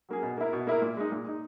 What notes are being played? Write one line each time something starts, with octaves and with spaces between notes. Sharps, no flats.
F#3 A#3 C#4 G#4
B2
A#3 E4 A#4
B2
A#3 E4 A#4
A#2
G#3 D#4
A#2
G#3 D#4